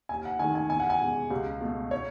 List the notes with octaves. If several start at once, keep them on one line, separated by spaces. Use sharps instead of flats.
D#2 G#5
F#5
D#3 A3 G#5
G#5
E2 G#5
F#5
G#5
B2 G#3
C#2
B2 A3
C#5